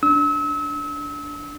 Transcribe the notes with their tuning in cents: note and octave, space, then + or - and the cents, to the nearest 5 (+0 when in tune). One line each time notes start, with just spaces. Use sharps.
D4 -15 E6 -35